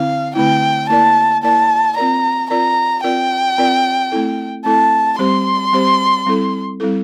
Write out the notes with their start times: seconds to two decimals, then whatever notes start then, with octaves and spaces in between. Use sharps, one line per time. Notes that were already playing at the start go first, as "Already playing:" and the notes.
Already playing: D3 C4 E4 F5
0.35 D3 A3 C4 E4 G5
0.89 A#3 E4 A#4 D5 A5
1.43 A#3 E4 A#4 D5 A5
1.96 C4 F4 A#4 D5 A#5
2.50 C4 F4 A#4 D5 A#5
3.04 C4 F4 A#4 D5 G5
3.58 C4 F4 A#4 D5
4.12 A3 C4 E4 A4
4.65 A3 C4 E4 A4 A5
5.19 G3 C4 G4 C5 C6
5.73 G3 C4 G4 C5
6.26 G3 C4 E4 A4
6.80 G3 C4 E4 A4